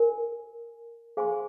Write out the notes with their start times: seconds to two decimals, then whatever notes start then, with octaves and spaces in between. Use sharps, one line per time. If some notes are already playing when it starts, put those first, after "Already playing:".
Already playing: A#4 G#5
1.17 G#4 C5 F5 G#5 C6